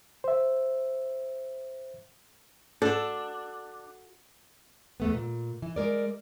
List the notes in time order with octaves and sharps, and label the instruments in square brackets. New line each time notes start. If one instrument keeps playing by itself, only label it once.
[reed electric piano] C5 E5
[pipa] D4 [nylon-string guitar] F#4 A4
[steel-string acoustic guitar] E2 A3 B3
A#2
E3
G#3 A#4 D5